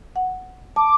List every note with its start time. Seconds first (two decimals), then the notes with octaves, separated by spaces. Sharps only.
0.16 F#5
0.76 A5 D6